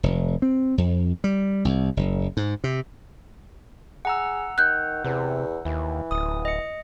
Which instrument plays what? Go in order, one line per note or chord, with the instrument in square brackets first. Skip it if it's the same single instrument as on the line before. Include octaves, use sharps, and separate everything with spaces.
[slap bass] F1
C4
F2
G3
C2
F#1
G#2
C3
[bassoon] G#4 [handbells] F#5 A#5 E6
[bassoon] D#3 [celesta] F#6 G6
[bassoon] E2 [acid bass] C3
[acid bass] D#2 [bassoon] E3
[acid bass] D1 [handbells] D#6
[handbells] D#5 C#7